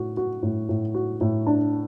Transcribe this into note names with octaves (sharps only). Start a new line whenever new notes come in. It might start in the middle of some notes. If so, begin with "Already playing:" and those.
Already playing: A2 F#4
F#4
A2
A2
F#4
A2
D4